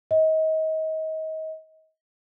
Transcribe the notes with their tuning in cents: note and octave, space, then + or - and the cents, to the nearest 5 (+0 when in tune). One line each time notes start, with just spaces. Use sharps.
D#5 +30